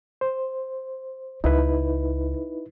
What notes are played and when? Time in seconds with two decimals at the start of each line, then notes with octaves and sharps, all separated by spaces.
0.21 C5
1.44 C#2 D#4 E4 B4